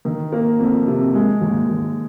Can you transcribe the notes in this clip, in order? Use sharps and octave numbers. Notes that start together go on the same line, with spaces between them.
D#3
A#3
F2
C3
G#3
D#2
D#2